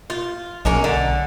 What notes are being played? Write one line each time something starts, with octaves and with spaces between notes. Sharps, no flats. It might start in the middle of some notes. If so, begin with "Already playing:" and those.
F4
B1 G#3 A#3 C#4
D3